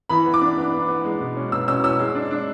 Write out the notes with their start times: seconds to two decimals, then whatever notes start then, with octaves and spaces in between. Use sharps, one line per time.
0.09 E3 B5
0.26 B3
0.34 D6
0.42 D4
0.57 B3
0.73 B3
0.89 B3
1.05 G#3
1.20 B2
1.37 C#4
1.52 B2 E6
1.68 C#4 E6
1.84 C#4 E6
1.99 G#3
2.15 D4
2.31 D4